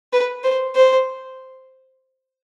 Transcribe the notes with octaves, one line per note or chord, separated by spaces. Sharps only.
B4
C5
C5